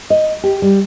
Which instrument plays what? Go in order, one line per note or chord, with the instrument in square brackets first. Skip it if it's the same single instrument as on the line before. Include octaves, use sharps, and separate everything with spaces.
[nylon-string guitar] D#5
G4
G3